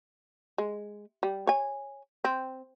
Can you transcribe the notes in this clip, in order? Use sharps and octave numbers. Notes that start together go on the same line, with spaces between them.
G#3
G3
C#5 G#5
C4